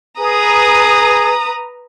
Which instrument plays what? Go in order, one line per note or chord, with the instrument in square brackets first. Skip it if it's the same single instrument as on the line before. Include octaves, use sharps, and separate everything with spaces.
[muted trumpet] G#4 [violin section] B4 A#5 D#6